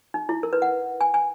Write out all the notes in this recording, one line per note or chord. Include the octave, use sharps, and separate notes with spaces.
D#4
E4
A#4
B4
F#5
G#5
G#5